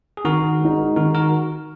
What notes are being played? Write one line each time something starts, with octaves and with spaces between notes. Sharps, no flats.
G#4
D#3 F#4 A#4
G#3 D#4
D#3 F#4 A#4
F#4 A#4